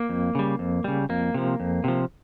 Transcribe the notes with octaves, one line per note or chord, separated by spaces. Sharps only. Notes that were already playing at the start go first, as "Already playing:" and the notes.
Already playing: A#3
F2
C#3 G3
F2
C#3 G3
F2 A#3
C3 F3
F2
C3 F3